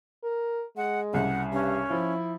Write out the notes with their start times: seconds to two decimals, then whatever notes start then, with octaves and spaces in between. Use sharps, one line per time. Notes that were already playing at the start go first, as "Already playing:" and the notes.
0.24 A#4
0.77 G#3 F#5
1.13 C2 C#3 F#5
1.53 G2 C#4
1.91 F3 E4